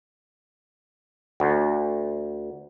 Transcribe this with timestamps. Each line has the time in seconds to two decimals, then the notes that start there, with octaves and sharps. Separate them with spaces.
1.40 D2